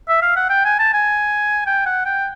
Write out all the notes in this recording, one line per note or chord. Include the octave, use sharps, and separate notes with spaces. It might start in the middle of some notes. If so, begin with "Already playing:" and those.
E5
F5
F#5
G5
G#5
A5
G#5
G5
F#5
G5